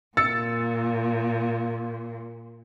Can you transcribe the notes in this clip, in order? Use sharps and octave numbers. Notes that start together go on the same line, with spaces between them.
A#2 E6 A6 C#7